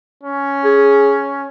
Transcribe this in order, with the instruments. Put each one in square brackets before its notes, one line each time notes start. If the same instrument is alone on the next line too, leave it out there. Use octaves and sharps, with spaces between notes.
[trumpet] C#4
[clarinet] G#4